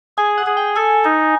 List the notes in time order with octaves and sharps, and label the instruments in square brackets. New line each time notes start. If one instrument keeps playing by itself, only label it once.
[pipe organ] G#4 [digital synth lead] G#5
[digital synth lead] F#5
[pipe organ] G#4
[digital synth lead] G5
[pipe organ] A4 [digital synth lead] G#5
[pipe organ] D#4